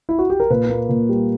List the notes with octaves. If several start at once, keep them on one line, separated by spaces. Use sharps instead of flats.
E4
F#4
G4
A#4
A#2 B4
A#3
A#2
G3